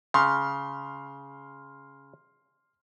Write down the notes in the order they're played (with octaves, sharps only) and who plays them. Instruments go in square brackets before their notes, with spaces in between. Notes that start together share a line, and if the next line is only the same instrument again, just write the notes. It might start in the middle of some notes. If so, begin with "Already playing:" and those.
[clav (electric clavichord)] C#3 [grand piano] C6 F6